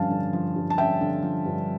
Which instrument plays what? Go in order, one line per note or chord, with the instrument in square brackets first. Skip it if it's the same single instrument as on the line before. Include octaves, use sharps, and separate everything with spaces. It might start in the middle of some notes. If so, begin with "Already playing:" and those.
Already playing: [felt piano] G2 D3 F3 C#4 F5 A5
D3
F3
G2
A5
C#4 E5 G5
D3
F3
G2